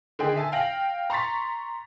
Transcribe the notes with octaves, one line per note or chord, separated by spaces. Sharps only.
D3 D#3 G#4 G5
E5 G#5 A5
F5 G5 A#6 F#7
A#5 C6 C#6 A6 B6